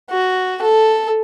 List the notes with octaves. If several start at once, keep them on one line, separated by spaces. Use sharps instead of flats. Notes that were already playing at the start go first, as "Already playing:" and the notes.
F#4
A4